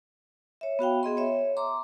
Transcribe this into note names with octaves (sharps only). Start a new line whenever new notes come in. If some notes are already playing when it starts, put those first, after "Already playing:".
C#5 E5
B3 F#4 F5 G5
B3 G#4 D#5 C6
C#5 E5
A#5 C6 D6